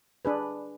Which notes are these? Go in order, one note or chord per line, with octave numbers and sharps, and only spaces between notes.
D4 G#4 B4